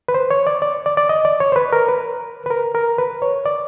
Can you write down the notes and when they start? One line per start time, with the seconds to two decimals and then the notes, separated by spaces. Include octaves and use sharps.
0.08 B4
0.14 C5
0.31 C#5
0.47 D5
0.62 D5
0.86 D5
0.97 D5
1.09 D#5
1.25 D5
1.40 C#5
1.52 C5
1.56 B4
1.73 A#4
1.89 B4
2.46 B4
2.50 A#4
2.75 A#4
2.98 B4
3.22 C#5
3.46 D5